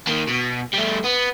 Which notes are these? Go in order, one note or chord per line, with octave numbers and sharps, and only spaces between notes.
D#3 A#3
B2
G3 A3
B3